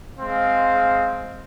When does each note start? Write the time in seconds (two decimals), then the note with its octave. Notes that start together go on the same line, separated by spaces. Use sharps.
0.20 G#3 C4 F5